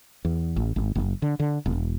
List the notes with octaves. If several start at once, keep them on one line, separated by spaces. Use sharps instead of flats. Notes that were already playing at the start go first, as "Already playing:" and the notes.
E2
A1
G#1
F#1
D3
D3
E1